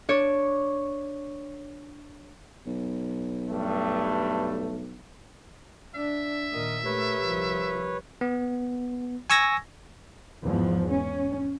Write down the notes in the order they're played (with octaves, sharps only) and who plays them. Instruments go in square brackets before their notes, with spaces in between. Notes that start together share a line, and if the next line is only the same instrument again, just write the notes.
[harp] D4 C#5
[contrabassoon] B1
[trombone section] G2 A3
[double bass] D4 [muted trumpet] E5
[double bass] A#2 D#3 [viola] A#4 D#5
[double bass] A3 [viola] G4 A#4 [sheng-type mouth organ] B4 C#5
[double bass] C2 F3
[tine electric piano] B3
G#5 C#6 E6 G#6 A#6
[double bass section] E2 G#2 F3
C#4